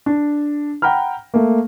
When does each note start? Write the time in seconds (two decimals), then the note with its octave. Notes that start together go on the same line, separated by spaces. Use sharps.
0.06 D4
0.82 F#5 G5 A#5 B5 F6
1.34 A3 A#3